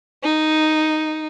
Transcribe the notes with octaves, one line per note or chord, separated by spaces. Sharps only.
D#4